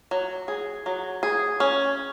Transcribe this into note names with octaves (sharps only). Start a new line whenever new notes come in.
F#3
G#4
F#3
G#4
C#4